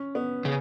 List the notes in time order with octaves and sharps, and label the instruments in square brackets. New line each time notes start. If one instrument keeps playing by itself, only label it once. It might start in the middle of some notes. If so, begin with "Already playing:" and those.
Already playing: [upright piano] C#4
B3
[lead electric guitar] C#3